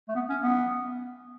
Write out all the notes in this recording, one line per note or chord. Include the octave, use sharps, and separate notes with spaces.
A3
B3
C#4
B3